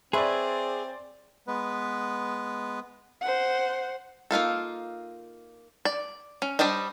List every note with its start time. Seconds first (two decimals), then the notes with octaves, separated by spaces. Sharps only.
0.13 C4 G#4 B4 C#5 D5 E5 C6
1.47 G#3 B3 B4
3.21 C5 F#5
4.31 A#3 D#4 F4 A4
5.85 D5
6.42 C#4
6.59 G3 D4 C5 D5 D#5